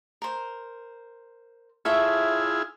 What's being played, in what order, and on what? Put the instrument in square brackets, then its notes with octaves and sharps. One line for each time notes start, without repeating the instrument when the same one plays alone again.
[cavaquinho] A#4 C5
[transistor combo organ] E4 F4 G#4 [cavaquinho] A4 C#5 E5